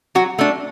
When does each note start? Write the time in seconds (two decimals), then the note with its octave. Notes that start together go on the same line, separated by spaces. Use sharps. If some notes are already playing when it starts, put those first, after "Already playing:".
0.15 F#3 F#4
0.39 A3 D4